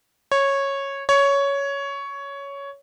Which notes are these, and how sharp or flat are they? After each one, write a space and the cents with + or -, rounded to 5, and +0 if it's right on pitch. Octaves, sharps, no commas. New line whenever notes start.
C#5 -10
C#5 +10